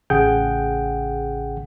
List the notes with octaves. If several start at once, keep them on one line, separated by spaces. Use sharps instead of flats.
A1 C#3 G#4 F#5 G5 G6